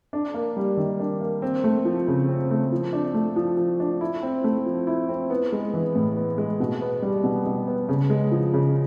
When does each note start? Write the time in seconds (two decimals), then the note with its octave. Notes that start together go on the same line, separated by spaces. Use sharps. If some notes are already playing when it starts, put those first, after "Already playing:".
0.13 D4
0.34 A#3
0.57 G3
0.77 D#3
1.00 D4
1.21 A#3
1.42 C4
1.64 A3
1.85 F3
2.08 C#3
2.29 C4
2.51 A3
2.72 F3
2.93 D4
3.14 A3
3.36 F3
3.57 F3
3.80 D4
4.01 E4
4.23 C4
4.44 A3
4.66 F3
4.87 E4
5.09 C4
5.30 B3
5.52 G#3
5.74 E3
5.95 A2
6.16 B3
6.38 G#3
6.60 B2
6.82 B3
7.02 G3
7.24 B2
7.46 B2
7.68 B3
7.89 C#3
8.10 G#3
8.32 F3
8.54 C#3